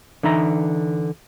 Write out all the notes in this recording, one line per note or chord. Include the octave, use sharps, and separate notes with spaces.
D3 E3 D#4 E5 A#5